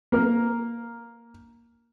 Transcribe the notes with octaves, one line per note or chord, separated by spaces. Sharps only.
A#3 A#4